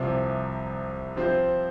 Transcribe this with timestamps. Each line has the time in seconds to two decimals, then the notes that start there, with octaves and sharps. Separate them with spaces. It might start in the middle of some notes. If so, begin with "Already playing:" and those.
Already playing: C2 C3 F3
1.16 F3 C4 F4 C5